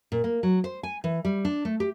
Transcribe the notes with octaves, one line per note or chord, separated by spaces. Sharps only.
A#2
A#3
F#3
C5
G#5
E3
G3
D4
A3
G4